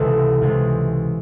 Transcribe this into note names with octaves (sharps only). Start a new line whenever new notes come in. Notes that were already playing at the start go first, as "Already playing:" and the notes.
Already playing: C#2 C3 E3 G#3 A4
C#2 C3 E3 G#3